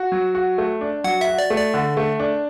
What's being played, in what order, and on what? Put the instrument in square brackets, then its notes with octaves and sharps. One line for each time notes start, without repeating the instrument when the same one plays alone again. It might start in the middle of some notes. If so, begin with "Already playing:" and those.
Already playing: [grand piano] F#4
F#3
F#4
A3
D4
[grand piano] F#3 [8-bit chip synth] F#5
[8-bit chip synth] E5
[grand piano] F#4
[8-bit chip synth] D5
[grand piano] A3
[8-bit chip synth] D5
[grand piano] D3
A3
D4